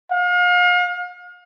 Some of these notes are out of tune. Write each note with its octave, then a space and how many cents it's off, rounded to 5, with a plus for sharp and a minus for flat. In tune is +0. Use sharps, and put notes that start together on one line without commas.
F5 +40